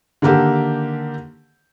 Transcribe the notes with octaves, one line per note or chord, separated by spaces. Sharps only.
D3 D#3 A#3 G4 A4